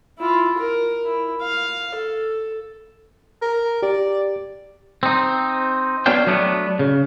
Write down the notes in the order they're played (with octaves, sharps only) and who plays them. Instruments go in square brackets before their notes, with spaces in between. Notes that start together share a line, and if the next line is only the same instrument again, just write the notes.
[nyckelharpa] E4 F4
A#4
E4
F5
A4
[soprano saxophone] A#4
[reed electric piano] G4 [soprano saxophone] D5
[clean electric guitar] C4 D#4
B3 D4 F#4 C#5 F5 G5
F#3 A3 B3 D4
C#3